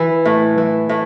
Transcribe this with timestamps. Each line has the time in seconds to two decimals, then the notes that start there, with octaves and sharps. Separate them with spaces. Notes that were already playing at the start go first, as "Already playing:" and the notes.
Already playing: E3 B4
0.25 A2
0.58 E3
0.89 A2